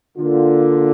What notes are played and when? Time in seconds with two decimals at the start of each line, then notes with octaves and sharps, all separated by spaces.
0.17 D3 A#3 F4